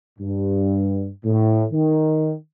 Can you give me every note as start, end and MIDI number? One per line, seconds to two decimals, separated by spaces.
0.19 1.09 43
1.26 1.64 45
1.73 2.34 51